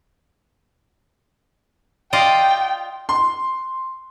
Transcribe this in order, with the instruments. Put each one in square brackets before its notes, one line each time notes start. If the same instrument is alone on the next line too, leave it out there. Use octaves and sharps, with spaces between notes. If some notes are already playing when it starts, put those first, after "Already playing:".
[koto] F4 D5 D#5 [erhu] G5
[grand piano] C6